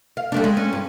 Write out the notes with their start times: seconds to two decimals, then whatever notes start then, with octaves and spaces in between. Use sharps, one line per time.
0.17 F5
0.32 G3 A3 D4
0.44 G#3
0.57 C#4
0.73 G2